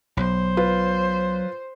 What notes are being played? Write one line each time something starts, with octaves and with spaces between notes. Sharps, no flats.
B1 F#3 C5
F4 B4